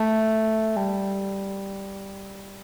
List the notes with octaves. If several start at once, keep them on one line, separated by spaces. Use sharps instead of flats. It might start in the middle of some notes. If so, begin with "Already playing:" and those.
Already playing: A3
G3